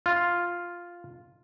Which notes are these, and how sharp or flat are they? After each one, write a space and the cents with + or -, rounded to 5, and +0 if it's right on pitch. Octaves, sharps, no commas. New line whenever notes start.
F4 +0